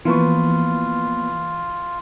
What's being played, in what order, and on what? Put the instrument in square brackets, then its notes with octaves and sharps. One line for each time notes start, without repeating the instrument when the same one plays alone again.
[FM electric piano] E3 [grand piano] F3 B4 C#6 [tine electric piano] A#3 B3 [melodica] F4